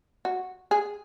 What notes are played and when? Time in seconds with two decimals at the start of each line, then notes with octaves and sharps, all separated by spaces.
0.25 F#4
0.71 G#4